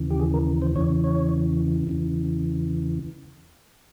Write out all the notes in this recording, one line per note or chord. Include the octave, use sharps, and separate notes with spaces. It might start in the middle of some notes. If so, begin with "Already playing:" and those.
Already playing: D#2 C#3 E3
G4
G#4
A#4
C5
E2 C#3 E3 C#5
C#5
E2 C#3 E3